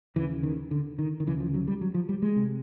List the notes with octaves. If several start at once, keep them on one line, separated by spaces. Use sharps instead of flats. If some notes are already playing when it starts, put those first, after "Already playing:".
D#2 C#3 E3
D#3
D3
D#3
D#3
D2 C#3 E3
F3
F#3
G3
F#3
F3
G3
G#3
C3